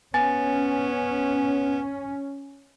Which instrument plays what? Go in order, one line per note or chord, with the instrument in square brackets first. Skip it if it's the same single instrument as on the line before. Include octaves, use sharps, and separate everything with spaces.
[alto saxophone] B3 [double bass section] C#4 [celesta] G#5 A6